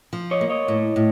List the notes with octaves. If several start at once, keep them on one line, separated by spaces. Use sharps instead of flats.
F3
C#5 D#5
A#3
C#5 D#5
A2
A2